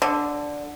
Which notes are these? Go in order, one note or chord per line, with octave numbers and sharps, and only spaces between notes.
D3